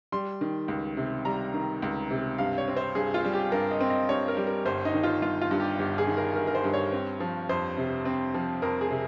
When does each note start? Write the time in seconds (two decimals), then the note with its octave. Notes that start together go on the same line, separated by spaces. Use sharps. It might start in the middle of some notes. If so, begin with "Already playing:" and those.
0.12 G3 C6
0.41 D#3
0.68 C#2
0.97 C3
1.25 G3 A#5
1.54 D#3
1.82 C#2
2.11 C3
2.38 G2 F5
2.58 C#5
2.68 C4
2.77 C5
2.95 G2 G#4
3.14 F4
3.25 G3
3.34 G4
3.52 G2 A#4
3.71 D#5
3.80 C4
3.90 D#5
4.09 G2 C#5
4.28 A#4
4.37 G3
4.47 A#4
4.65 G1 C5
4.85 D#4
4.94 D#3
5.03 F4
5.22 G1 F4
5.41 F4
5.51 G2
5.60 G4
5.79 G1 G4
5.98 G#4
6.07 D#3
6.17 A#4
6.36 G1 A#4
6.47 A#4
6.55 C5
6.64 G2
6.74 C#5
6.92 C4
7.20 F3
7.49 F2 C5
7.78 C3
8.05 C4
8.34 F3
8.62 F2 A#4
8.81 G#4
8.91 C3